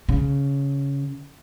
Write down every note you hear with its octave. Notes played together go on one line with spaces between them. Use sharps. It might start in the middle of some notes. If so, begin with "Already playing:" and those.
C#3